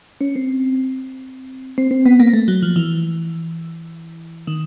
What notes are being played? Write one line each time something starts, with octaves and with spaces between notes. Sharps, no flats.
C#4
C4
C4
C4
B3
A#3
A3
F#3
F3
E3
D#3